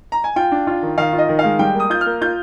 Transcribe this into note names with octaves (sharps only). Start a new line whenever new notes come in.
A#5
G#5
F4 G5
D4
F4
D#3
D#3 F5
F4
D#5
D#3
F5
G#3
G3 G5
A#3
D#6
F4 G6
F6
A#3
F4 G6